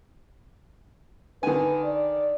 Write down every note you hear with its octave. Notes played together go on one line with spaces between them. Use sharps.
D3 D#3 B4 G#5
D5